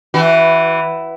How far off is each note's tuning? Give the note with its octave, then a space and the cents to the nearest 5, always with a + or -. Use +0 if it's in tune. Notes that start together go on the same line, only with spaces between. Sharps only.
E3 +0 F#4 +35